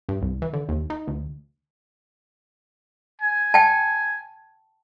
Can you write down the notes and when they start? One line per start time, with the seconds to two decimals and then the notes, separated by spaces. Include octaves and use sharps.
0.09 G2
0.22 C2
0.42 E3
0.53 D3
0.69 D#2
0.90 D#4
1.07 D2
3.21 G#5
3.54 G5 A5